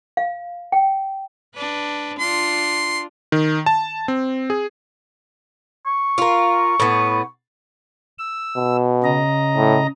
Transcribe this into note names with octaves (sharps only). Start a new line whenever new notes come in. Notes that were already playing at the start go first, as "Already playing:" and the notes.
F5
G5
D4 B4
D4 F4 C6
D#3
A5
C4
G#4
C#6
F4 A#4
A2 B3
E6
B2
C#3 D#5 A#5
A2